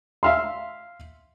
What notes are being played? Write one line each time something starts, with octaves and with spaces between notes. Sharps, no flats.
E5 F5 C6